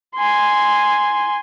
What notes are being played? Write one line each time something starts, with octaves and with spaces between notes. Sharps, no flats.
G#5 C6